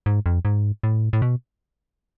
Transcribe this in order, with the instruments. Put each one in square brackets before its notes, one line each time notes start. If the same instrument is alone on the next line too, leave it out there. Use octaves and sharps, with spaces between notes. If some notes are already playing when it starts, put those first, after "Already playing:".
[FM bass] G#2
F2
G#2
A2
A2
B2